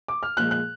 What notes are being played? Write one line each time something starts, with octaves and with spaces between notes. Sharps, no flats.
D6
F6
A#2 F3 G#3 F#6
F#6